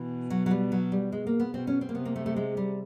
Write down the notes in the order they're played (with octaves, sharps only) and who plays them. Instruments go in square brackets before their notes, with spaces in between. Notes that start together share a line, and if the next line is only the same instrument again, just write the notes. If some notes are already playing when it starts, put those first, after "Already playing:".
Already playing: [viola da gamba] B2 [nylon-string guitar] E3
[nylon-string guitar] F#3
F#3
G3
F#3
G3
G#3
A#3
B3
[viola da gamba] B2 [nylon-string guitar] C4
[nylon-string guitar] C#4
C4
A#3
[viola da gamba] C3 [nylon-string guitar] B3
[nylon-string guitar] A#3
A3
A3
G#3
G3